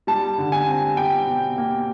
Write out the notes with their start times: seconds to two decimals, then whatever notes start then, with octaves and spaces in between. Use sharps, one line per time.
0.07 G3 A5
0.38 D3
0.52 G#5
0.68 C4
0.97 G3 G5
1.27 B2
1.58 A#3